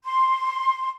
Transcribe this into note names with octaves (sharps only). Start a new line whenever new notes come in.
C6